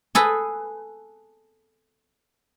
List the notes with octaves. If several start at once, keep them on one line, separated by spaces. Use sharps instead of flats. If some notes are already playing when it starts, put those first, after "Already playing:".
G#4 A4 B4